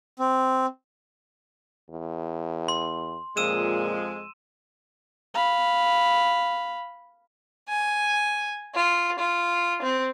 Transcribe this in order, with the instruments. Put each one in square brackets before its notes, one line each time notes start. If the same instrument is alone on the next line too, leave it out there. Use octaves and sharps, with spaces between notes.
[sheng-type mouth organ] C4
[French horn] E2
[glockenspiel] C6
[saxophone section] F2 F3 G#3 [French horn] A#2 [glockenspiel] E6 D#7 E7
[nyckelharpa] F5 B5
[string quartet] G#5
F4
F4
C4